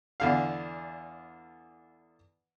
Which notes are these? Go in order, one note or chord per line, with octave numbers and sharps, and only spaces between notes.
E2 D3 F5